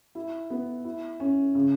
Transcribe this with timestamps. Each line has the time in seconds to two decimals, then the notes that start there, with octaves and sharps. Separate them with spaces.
0.15 E4
0.50 B3
0.85 E4
1.20 C#4
1.55 C#3